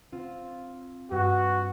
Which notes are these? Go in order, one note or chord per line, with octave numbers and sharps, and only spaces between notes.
C4 F4
G2 F#4